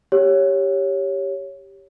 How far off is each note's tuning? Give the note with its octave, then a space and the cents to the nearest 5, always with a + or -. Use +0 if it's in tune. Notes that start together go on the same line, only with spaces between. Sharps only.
G4 +0 C#5 +0